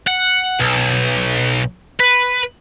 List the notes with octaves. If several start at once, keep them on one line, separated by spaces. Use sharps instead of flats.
F#5
B1
B4